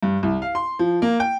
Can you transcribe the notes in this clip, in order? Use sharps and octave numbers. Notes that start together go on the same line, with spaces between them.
G2
C2
F5
C6
F3
A#3
G5